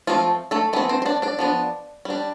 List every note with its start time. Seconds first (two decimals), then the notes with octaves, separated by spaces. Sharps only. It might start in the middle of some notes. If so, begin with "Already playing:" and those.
0.07 F3 A3 C4 F4
0.51 A3 A4
0.73 E3 A3 B3 C4 B4
0.89 C4 C5
1.02 C5
1.06 D4 D5
1.22 D4 D5
1.39 F3 B3 D4
2.05 G3 D4